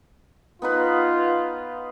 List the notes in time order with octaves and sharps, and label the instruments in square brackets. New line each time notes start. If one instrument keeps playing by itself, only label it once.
[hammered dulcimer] B3 D#4 B4 [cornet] F4